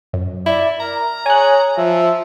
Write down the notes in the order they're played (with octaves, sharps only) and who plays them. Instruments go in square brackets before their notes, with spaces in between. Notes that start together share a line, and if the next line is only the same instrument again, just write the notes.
[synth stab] F#2
[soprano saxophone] E4 [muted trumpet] D5
[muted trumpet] A#4 [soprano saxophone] A#5
[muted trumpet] G#4 [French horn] C#5 [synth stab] G#5 F#6
[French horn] F3 [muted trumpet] E5